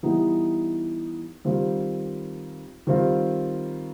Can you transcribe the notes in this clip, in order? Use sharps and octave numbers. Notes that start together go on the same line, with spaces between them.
E3 G3 B3 D#4
D#3 G3 C4 F4
D#3 G3 C4 F4